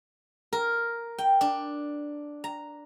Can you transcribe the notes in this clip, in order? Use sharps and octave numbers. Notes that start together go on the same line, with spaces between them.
A#4
G5
D4
A#5